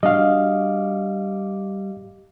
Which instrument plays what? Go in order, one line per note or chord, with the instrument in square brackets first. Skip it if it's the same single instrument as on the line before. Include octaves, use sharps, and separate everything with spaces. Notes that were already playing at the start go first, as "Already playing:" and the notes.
[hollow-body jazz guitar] G3 D4 F#4 [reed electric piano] D#5 F5